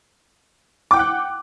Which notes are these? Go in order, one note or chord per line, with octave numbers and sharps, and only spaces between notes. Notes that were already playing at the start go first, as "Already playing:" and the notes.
F#5 G5 D6 F#6